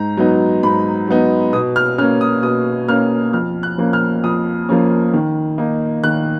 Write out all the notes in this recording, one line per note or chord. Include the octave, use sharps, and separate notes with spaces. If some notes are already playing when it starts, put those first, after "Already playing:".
Already playing: G#2 A#5
F#3 B3 D#4
G#2 B5
F#3 B3 D#4
B2 D#6
F6
A#3 C#4 F6
D#6
B2 D#6
A#3 C#4 F6
F2 F6
F#6
F3 A#3 C#4
F6
F2 D#6
F3 A#3 C#4
D#3
A#3 D#4
D#3 F#6